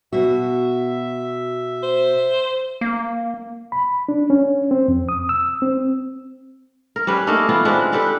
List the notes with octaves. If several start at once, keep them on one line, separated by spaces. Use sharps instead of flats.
B2 F#4 E5
C5
A#3
B5
D4
C#4
C4
F2
D#6
E6
C4
A#4
G3 C#4 B4
A3 A#3 D#4 A#4
E3 B3 F4
G#3 C4 D4 B4
D4 G4 A4 B4